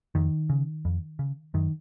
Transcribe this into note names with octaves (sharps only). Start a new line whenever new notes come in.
F2 D#3
C#3
F2
C#3
F#2 D#3